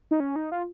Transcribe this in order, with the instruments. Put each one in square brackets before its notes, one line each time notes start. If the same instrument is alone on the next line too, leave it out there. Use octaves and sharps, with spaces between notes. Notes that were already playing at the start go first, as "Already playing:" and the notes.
[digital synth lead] D#4
C#4
D#4
F4